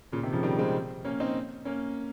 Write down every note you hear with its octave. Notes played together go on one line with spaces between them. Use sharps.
A#2 C#3
C3 D#3
C#3 F3
D#3 G3
G#3 C4
A#3 C#4
C4 D#4
A#3 C#4